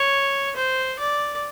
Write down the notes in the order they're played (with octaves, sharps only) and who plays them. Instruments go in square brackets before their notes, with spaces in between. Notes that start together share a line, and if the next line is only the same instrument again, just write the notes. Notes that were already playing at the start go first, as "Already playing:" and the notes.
Already playing: [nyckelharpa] C#5
C5
D5